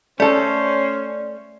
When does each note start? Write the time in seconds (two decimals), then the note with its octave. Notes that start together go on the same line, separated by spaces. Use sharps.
0.20 A3 C#4 A4 C5 D5